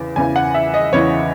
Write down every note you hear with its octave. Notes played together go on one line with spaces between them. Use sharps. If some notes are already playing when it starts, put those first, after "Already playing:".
Already playing: E2 C#3 E3
E2 C#3 E3 G#5
F#5
E5
D#5
E2 C#3 E3 C#5